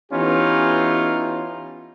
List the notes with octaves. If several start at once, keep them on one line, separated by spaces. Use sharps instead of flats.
E3 B3 C#4 D#4 F4 G4